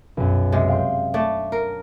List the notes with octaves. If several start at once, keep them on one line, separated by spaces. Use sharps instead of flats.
B1 F#2
C3 G#3
F5 G5 C6
A3 D4
A#4